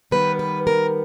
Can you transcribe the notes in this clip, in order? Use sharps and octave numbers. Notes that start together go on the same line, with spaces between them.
D#3 G3 B3 B4
B4
A#4